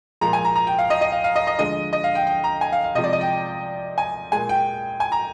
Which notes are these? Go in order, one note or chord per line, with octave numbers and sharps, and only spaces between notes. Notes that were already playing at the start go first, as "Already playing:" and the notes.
A#2 F3 G#3 A#5
G#5
A#5
A#5
G5
F5
D#5
D#5
F5
F5
D#5
D#5
D3 F3 G#3 D#5
D#5
F5
G5
G5
A#5
G#5
F5
F5
C3 F3 G#3 D#5
D5
D#5
G5
G#5
A#2 G#3 G#5
G5
G#5
A#5